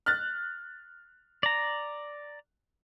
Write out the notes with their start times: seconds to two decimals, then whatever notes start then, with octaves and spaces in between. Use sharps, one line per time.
0.06 F6 F#6 A6
1.43 D5 A#5